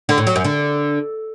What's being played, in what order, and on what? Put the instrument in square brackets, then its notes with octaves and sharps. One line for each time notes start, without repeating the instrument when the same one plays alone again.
[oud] D3
A2
F#3
F#2
D3